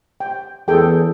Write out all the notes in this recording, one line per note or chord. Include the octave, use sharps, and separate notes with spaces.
G5
E2 G#4 A4 G5